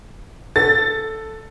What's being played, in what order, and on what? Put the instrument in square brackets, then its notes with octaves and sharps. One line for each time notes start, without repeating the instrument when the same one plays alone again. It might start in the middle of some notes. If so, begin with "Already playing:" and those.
[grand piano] A4 [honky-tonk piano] A6